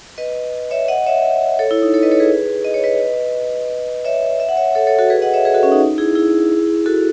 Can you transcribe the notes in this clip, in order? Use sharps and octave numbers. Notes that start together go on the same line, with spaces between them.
B4 D#5
C#5 E5
D#5 F#5
C#5 E5
A4 C#5
E4
D#4
A4 C#5
B4 D#5
A4 C#5
G#4 B4
D#5
C#5
B4 D#5
C#5 E5
E5
F#5
C#5 E5
A4 C#5
A4 C#5
F#4 A4
G#4 B4
D#5 F#5
C#5 E5
G#4 B4
F#4 A4
C#4
D#4
E4 G#4
E4 G#4
F#4 A4